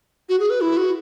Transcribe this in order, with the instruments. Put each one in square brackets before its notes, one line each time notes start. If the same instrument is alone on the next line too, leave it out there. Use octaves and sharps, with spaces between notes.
[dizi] F#4
G#4
B4
E4
F#4